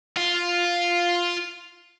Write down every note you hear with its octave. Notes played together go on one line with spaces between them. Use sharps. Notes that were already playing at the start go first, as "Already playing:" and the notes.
F4 F5